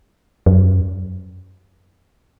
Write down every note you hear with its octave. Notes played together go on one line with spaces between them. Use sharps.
F#2